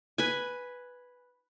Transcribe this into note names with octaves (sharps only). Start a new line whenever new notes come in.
B4 G#5